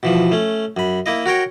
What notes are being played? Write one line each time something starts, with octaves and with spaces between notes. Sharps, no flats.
B2 E3 F3
A3 C#4
F#2 B5
A#3 E4 D#5
F#4 A#4 C#5 G5